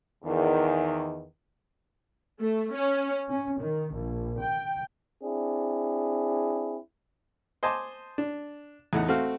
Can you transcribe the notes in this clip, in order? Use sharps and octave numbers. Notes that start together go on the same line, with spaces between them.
E2 D#3
A3
C#4
C#4
D#3
A#1
G5
C4 D4 E4 G#4
C5 D#5 G#5 A5 C6 D6
D4
E2 A2 A3 D#4 F#5
A3 C4 F#4 F5